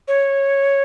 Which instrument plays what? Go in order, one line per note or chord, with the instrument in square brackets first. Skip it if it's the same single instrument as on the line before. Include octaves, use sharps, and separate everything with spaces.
[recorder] C#5